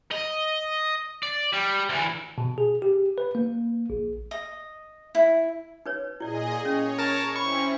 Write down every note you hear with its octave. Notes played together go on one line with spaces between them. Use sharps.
D#5
D5
G3
D2 E3
B2
G#4
G4
B4
A#3
A#1
D#5
E4
D#4 B4 C#5
A#2 E4 G#4 D5 D#5
C#4 C#5
A#4 A5
C4 C#4 E4 B5 C#6